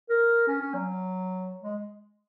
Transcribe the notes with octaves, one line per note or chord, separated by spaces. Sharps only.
A#4
C#4
C#4
F#3
G#3